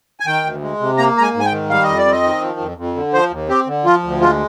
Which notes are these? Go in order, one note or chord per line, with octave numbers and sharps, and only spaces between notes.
G#5
D#3 G5
D2
G#3
C3
A#3 A#5
G#2 A#5
G#5
G#2
G#5
G5
D#3
G3 F5
F2 D#5
D5
C4
D#5
D#3
F3
F2
F2
D3
F3 C5
D#2
C4 G4
D3
F3 F4
D2
G#3 F4